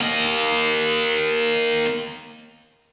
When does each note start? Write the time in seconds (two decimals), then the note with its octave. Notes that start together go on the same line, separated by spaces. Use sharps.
0.01 A#3 D#5